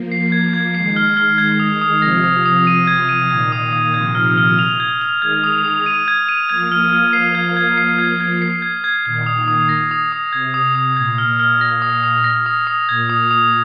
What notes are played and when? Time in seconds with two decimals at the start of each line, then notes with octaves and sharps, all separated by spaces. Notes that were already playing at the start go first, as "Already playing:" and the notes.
Already playing: F3 A#3
0.12 C7
0.32 G#6
0.53 G#6
0.75 D#3 G#3 C7
0.96 F6
1.17 F6
1.38 G#6
1.60 D#6
1.81 D#6
2.02 C3 F3 A#6
2.24 D#6
2.46 D#6
2.67 D#7
2.87 G#6
3.09 D#7
3.30 A#2 D#3 G#6
3.52 D#6
3.73 D#6
3.94 C3 F3 G#6
4.15 F6
4.37 F6
4.59 F7
4.80 G#6
5.01 F7
5.22 D#3 G#3 G#6
5.44 D#6
5.65 D#6
5.86 D#7
6.08 G#6
6.29 D#7
6.49 F3 A#3 G#6
6.72 F6
6.93 F6
7.13 F3 A#3 C7
7.35 G#6
7.57 G#6
7.77 C7
7.98 G#6
8.20 G#6
8.42 C7
8.62 G#6
8.84 G#6
9.05 A#2 D#3 G#6
9.26 D#6
9.48 D#6
9.69 A#6
9.91 D#6
10.12 D#6
10.33 C3 G#6
10.54 D#6
10.75 D#6
10.97 A#2 G#6
11.18 F6
11.39 F6
11.61 A#6
11.82 D#6
12.04 D#6
12.24 A#6
12.46 D#6
12.67 D#6
12.89 A#2 G#6
13.10 D#6
13.31 D#6